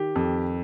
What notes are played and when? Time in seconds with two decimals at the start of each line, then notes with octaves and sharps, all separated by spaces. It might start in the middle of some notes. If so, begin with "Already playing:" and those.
Already playing: D#3 G4
0.15 F2